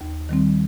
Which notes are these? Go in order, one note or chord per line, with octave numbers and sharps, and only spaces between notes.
D#2
D#3 G3 C4